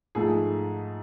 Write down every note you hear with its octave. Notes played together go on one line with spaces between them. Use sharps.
G#2 F3 A3 G#4